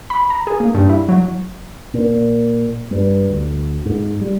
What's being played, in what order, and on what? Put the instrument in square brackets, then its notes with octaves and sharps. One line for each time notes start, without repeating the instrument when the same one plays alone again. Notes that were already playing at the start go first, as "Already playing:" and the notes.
[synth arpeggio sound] B5
A#5
G#4
A#3
G2
E4
F#3
[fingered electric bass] A#2
G2
D2
G#2
G3